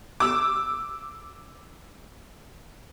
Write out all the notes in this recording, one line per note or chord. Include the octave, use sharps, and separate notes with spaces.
D6 E6